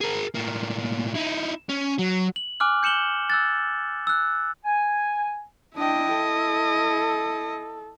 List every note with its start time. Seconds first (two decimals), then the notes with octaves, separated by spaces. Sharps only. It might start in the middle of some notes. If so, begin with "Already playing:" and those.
0.01 G#4 A#4
0.35 A2 A#3
1.15 D#4 E4
1.69 C#4
1.98 F#3
2.36 F#7
2.60 G#5 D6 F6 F#6
2.83 G6 C#7 E7 F#7 G7
3.30 E6 F#6 A6
4.07 E6 F#6
4.65 G#5
5.76 D4 E4 D#5 G5
6.16 A4